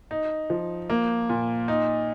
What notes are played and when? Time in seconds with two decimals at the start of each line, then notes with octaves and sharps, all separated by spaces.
0.11 D#4
0.50 F3
0.89 A#3
1.29 A#2
1.68 D#4